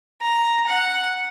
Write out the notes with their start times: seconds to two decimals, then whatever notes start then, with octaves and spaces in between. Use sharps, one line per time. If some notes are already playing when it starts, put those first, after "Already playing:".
0.22 A#5
0.67 F#5